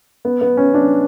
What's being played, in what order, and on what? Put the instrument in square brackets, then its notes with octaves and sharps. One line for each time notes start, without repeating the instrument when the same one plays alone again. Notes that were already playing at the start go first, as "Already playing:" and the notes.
[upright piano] B3
B3
C#4
D4